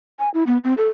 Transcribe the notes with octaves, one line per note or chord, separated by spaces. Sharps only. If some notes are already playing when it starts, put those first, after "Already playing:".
G#5
E4
B3
C4
A4